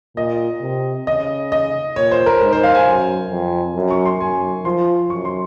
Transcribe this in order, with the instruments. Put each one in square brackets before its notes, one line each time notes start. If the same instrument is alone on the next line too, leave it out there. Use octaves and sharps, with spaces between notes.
[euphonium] A#2 [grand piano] D#5
[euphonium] C3
[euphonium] C#3 [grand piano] D#5
[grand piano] D#5
[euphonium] A#2 [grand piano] C#5
[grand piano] C5
A#4
[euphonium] G#2 [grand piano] A#4
[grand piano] C5
F5
G#5
[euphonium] F#2
F2
F#2
[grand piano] C#6
C6
[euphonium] F#2 [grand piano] G#5
[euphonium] F3 [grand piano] C6
[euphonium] F#2 [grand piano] C#6
[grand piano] C6